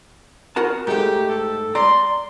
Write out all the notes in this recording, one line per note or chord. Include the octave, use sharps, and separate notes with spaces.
F#4 A#4 A5
G#2 A3 G4
A4
D5 A#5 C6